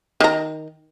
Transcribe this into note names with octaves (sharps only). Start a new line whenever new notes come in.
D#3 A#5